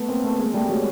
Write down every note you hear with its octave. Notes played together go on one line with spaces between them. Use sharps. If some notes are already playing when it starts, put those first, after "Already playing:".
Already playing: A3 B3
A#3 C4
A3 B3
G#3 A#3
G3 A3
F#3 G#3